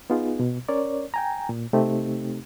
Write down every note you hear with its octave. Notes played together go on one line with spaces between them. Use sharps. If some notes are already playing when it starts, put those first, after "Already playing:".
B3 D#4 F4 G#4
B2
C#4 A#4 C#5 D5
G5 G#5 A#5
A#2
C3 A3 C4 D#4 G4